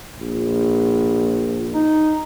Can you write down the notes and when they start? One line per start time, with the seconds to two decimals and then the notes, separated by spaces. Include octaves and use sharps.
0.19 A#1
1.74 D#4